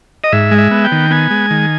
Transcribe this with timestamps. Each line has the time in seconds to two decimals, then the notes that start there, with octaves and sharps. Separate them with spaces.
0.24 D#5
0.32 G#2 E5
0.51 G#3
0.58 E5
0.71 B3
0.84 G5
0.92 D#3
1.11 B3 G#5
1.30 G#3
1.51 D#3